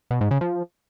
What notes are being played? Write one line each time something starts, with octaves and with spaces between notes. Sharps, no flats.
B2
G#2
C#3
F3